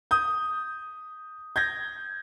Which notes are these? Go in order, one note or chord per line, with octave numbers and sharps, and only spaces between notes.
D#6 G6
G6 G#6 A#6